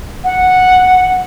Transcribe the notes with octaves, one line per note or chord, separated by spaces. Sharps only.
F#5